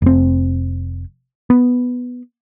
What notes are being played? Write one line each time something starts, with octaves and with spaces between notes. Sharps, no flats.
F1 C4
B3